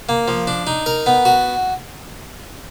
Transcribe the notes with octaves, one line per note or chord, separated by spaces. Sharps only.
A#3
F3
D4
D#4
A#4
B3
F#4